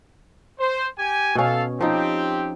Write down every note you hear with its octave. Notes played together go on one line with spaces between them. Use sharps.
C5
G4 G#5
B2 C#4 A4 F5
F3 C4 D#4 G4